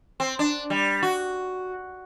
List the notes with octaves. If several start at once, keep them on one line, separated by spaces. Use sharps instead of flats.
C4
D4
G3
F#4